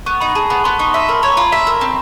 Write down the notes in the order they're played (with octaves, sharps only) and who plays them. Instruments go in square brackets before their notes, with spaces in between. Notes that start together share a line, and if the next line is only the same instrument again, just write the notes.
[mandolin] B3 [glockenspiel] C#6
[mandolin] D#4 [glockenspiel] B5
[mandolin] G#4 [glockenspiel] A5
[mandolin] B3 [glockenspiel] B5
[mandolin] B3 [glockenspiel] C6
[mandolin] D#4 [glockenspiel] C#6
[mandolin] E5 [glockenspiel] C6
[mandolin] A#4 [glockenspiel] B5
[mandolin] C#5 [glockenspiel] A#5
[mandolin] F4 [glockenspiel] B5
[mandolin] E5
A#4
C4